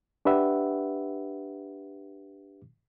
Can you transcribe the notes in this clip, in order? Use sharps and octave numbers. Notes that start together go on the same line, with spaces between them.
D4 G4 B4 E5 F#5